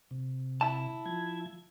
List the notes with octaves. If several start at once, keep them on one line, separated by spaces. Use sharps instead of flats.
C3
E4 A5
F3 G#6